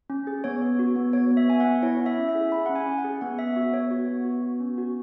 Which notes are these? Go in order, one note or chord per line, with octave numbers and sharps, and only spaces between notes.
C#4
G#4
B3 C#5
B3
F#4
B3
B3 C#5
B3
E5
B3 G#5
F#5
B3
E4 C#5
E4
E5
C#4
E5
G#4
G#4 B5
C#4 F#5
G#5
C#4
F#5
G#4
B3 F#5
B3 E5
F#4
B3 C#5
F#4
B3
F#4
B3
C#4
F#4